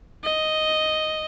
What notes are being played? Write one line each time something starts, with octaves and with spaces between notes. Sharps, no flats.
D#5